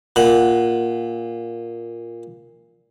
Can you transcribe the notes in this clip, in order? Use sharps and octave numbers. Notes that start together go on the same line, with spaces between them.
A#2 F#5